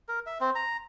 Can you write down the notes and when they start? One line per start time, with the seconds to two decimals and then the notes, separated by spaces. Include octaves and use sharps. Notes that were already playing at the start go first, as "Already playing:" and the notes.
0.08 A#4
0.26 E5
0.41 C4
0.55 A#5